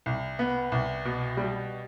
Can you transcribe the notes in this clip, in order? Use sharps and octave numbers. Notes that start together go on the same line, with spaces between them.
C2
B3
C2
B2
G3